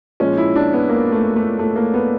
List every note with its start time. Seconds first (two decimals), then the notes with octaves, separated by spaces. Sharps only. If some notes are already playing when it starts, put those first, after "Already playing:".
0.20 A#2 F3 G#3 C#4
0.37 E4
0.56 D4
0.73 B3
0.89 A#3
1.12 A3
1.36 A3
1.59 A3
1.76 A#3
1.94 B3